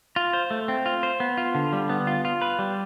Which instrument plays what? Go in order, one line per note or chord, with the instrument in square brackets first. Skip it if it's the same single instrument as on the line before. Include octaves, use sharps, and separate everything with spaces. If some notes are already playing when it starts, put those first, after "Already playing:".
[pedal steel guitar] F4
C5
A3
C4
F4
C5
B3
F4
D3
G3
B3
F4
F4
B4
G3